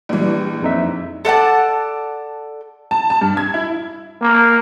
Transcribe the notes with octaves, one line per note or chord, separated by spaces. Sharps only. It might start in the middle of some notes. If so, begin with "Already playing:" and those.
A#1 E3
G3
F2 D#4 E5
A4 D5 F#5 A5
A5
A5
G2
G#6
E4
A#3